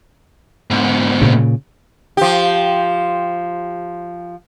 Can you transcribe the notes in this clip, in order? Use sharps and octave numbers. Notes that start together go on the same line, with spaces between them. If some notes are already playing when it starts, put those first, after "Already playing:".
G#2 B2
A#2 C#3
F3 G4